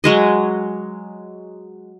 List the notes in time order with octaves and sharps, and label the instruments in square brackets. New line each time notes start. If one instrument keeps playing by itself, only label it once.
[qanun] F#3 G#3 D#5